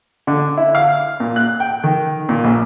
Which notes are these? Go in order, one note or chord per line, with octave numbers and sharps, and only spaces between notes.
D3
E4
F5
A#2
F#6
G5
D#3
A#2
A#1